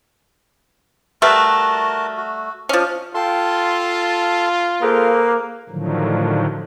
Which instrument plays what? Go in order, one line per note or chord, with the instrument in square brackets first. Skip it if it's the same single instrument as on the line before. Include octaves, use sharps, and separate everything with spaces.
[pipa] G3 A3 B4 [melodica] F#4 A#4 A5
[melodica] F#4
[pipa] F3 C#4 [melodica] D4 D#5
[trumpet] F4 [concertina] A4 A5 C6 [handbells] F5 G5
[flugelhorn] A#3 [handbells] G#4 A4 C5 [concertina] B4 F5
[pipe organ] A2 D3 D#3 F3 F#3